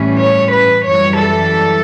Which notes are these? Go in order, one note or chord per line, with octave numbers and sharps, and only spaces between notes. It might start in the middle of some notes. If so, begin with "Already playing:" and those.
Already playing: A2 E3 G3 C#4
C#5
B4
F#2 E3 G3 C#5
A4